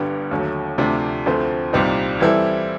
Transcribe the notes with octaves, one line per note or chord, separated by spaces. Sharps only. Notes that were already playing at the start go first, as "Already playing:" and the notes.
Already playing: G1 G2 D3 G3 B3
D#2 D3 F#3 A3
D2 C3 F3 A3 D4
D2 D3 F3 A3 C4
C2 A#2 G3 C4 D#4
E3 G3 C4 E4 A4